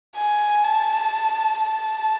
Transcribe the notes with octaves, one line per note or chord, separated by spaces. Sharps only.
G#5
A5
A5